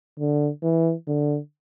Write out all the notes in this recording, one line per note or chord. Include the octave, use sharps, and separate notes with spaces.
D3
E3
D3